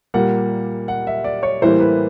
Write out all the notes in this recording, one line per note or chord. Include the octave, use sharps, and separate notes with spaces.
A#2 G3 A#3 F#5
F#5
E5
D5
C#5
A2 E3 G3 A#3 C5
B4